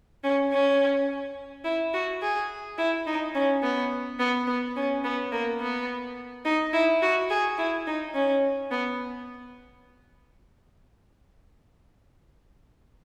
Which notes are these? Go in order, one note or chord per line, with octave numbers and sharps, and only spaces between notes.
C#4
C#4
E4
F#4
G#4
E4
D#4
C#4
B3
B3
B3
C#4
B3
A#3
B3
D#4
E4
F#4
G#4
E4
D#4
C#4
B3